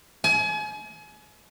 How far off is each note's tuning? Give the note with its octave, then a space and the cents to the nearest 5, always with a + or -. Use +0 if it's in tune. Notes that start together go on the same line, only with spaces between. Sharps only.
G#5 +35